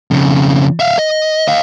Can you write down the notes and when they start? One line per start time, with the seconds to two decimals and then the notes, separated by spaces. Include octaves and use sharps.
0.11 F2 C#3
0.80 E5 F5
0.98 D#5
1.48 D#5 F5